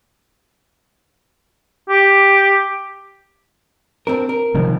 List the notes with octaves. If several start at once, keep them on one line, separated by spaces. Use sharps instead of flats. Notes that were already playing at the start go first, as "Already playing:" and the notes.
G4
C4 D4 A#4
A#4
C3 D#3 F3